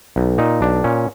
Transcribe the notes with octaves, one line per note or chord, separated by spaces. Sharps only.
B1
A#2 D#4
B1 D4
A#2 C#4